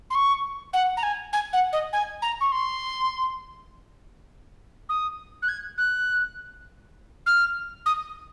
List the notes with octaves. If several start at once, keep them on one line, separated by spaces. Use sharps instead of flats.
C6
C#6
F#5
A#5
G#5
G#5
F#5
D#5
G#5
A#5
C#6
C6
D#6
F#6
G#6
F#6
F6
D#6